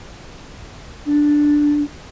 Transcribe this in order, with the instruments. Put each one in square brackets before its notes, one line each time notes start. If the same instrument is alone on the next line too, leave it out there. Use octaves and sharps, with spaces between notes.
[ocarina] D4